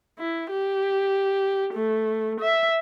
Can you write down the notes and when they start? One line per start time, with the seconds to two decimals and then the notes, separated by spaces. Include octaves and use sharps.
0.19 E4
0.51 G4
1.74 A3
2.41 E5